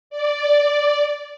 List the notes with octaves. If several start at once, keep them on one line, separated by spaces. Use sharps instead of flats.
D5